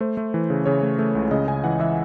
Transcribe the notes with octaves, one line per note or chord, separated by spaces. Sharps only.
A3 C5
A3
E3
C#3
C#3 C#5
A3
A3
C#2
C#3 D#5
C#3 G#5
E3 F#5
E3 E5